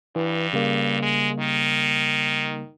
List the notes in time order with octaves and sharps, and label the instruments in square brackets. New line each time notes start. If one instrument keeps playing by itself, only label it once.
[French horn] G2 [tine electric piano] E3
[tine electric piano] C#3 G3 A#3
[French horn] G#3
D#3